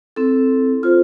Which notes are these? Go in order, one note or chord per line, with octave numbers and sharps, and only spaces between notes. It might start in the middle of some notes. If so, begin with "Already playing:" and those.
C4 E4 A4
C4 F4 A4 C5